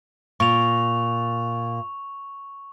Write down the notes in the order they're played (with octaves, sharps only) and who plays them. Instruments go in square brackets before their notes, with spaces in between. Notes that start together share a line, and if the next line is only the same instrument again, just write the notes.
[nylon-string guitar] A#2 [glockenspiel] C#6 F7